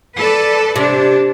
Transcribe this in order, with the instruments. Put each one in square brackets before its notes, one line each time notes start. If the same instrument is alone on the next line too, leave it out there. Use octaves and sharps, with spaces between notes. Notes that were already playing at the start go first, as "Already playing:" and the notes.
[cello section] A4 B4 D5
[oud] C3 [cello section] D4